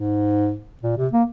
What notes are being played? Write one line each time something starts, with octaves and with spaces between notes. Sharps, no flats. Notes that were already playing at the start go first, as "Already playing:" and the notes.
Already playing: G#2
A#2
C3
A#3